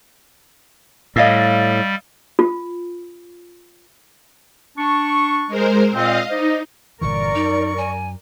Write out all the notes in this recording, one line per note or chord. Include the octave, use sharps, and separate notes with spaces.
A2 G3 D#5 F5 E6
F4
D4 C#6
G#3 A#4 C5
A#2 C4 D#5 F5
D#4 C5 D5 D#5
G1 A#2 E3 A#4 D5 C#6
F#2 D#4
G#5